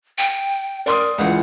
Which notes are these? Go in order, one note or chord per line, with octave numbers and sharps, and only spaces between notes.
G5
A#4 D5 C6 D#6
C#2 E3 F4 F#5